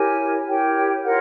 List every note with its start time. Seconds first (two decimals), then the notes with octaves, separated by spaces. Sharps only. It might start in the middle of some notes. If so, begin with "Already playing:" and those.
Already playing: E4 G4 A#4 C#5 G#5
0.47 E4 G4 A#4 C#5 G5
1.05 F4 A#4 C#5 F#5